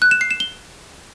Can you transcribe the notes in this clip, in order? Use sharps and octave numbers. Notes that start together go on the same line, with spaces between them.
F#6
E7
C7
E7
G7